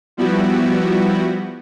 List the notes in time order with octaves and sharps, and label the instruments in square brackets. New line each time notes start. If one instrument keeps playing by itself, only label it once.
[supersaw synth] F3 G3 B3 E4 F#4 G4